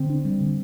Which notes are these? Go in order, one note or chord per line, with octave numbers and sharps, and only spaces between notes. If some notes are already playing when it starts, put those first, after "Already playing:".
Already playing: D3 C4
D4
G3
D3